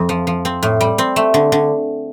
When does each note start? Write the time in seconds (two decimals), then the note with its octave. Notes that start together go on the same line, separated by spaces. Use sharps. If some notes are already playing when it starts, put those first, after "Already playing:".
Already playing: F2 C4
0.09 F3
0.27 F3
0.45 C4
0.63 A2
0.81 G3
0.98 C4
1.16 A3
1.34 D3
1.52 D3